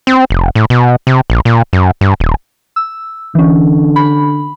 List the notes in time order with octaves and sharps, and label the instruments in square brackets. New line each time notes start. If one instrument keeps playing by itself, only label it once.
[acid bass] C4
F1
A2
B2
C3
A#1
A#2
F#2
G2
D#1
[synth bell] E6
[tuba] D3 [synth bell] E3 C#4
[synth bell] B5